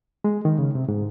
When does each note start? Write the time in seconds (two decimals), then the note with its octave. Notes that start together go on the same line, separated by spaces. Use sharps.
0.24 G#3
0.45 D#3
0.58 C#3
0.75 C3
0.88 G#2